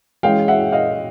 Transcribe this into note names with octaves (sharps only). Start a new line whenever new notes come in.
E3 G#3 C#4 F5 G5
E5 F#5
D#5 F5